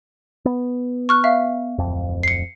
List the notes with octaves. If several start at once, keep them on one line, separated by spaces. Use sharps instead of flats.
B3
C#6 F6 F#6
E5 F5
D1 G1 F2
C7 C#7